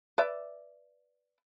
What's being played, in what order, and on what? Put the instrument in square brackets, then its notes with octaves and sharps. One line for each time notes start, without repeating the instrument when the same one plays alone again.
[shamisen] B4 D5 E5